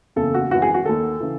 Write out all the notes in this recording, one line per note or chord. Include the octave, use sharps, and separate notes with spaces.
F#1 E2 C#3 A4
F#4
G#1 F#2 E3 F#4
G#4
F#4
D#2 D#3 A4
C#3 E3